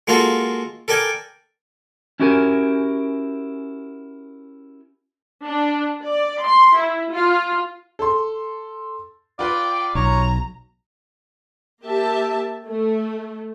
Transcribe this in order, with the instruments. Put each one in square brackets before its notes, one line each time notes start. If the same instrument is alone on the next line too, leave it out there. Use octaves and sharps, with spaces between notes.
[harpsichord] G#3 A#3 F4 F#4 A4
A4 A#4 D5 G5 G#5
[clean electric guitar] C#4 E4 F#4 G4 A#4 G#5
[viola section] D4
D5
C6
E4
F4
[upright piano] A4 C6
[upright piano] F4 B4 [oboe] D5 [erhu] G5
[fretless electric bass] B1 [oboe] C#5 [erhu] A#5
[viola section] A#3 G4 E5 A5
A3